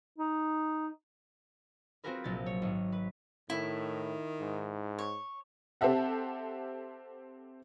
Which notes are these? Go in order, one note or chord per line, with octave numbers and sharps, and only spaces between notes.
D#4
C4 F4 F#4 G#4 A#4 B4
A#1 C3 F#3 A6
C#5
G#1
B4
A2 D#3 E4
G#2
C#5
C4 G4 A4 E5 F#5